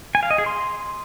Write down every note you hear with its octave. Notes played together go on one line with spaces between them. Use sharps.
G#5
F5
D#5
G#4
C6